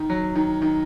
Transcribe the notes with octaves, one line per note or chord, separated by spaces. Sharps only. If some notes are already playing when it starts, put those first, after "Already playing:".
Already playing: D#3
F#3
D#3
D#3